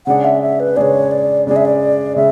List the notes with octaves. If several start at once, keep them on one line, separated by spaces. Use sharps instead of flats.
C#3 G#3 D4 G#4 F#5
E5
E5
B4
C#3 G#3 D4 G#4 C#5 D5
D5
C#3 G#3 D4 G#4 D5
E5
D5
C#3 G#3 E5